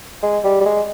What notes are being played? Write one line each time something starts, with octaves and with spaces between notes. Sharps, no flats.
G#3
G3
G3
G#3